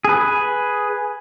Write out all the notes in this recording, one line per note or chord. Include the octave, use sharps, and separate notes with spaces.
G#4 B4